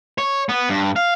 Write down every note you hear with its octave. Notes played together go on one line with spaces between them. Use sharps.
C#5
B3
G2
F5